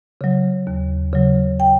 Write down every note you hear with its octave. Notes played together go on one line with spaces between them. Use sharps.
C#3 F#3
D#2
C#3 F#3
G5